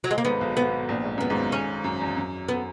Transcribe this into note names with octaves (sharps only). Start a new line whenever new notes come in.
F#3
G#3
A#3
G#1 G#2 B3
B1 B2
B3
A#1 A#2
G#2
F#2 B3
G#1 G#2
C#4
F#2
E2
F#2
B3